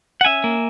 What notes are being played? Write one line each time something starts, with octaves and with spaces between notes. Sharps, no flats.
F#5
C#4 E5 G#5
A#3